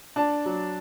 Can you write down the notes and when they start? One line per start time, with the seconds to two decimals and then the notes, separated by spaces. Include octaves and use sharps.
0.16 D4 A5
0.45 F#3